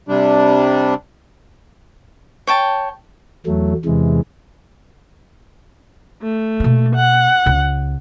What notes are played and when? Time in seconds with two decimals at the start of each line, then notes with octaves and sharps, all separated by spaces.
0.08 C3 G3 D4
2.47 C#5 G5 A5
3.46 E2 F#3 A3
3.85 E2 C3 E3 G#3
6.22 A3
6.60 B2 A#3
6.96 F#5
7.46 C#2 C#3